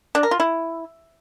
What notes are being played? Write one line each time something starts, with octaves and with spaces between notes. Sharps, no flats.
D4
A#4
F4
E4